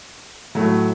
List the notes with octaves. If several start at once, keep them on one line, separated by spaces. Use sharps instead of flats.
A2 F#3 A3